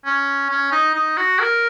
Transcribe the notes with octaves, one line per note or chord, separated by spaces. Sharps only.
C#4
C#4
D#4
D#4
F#4
A#4